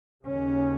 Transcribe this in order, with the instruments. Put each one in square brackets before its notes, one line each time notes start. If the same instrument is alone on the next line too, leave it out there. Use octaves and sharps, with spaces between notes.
[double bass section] D#2 C#3 C#4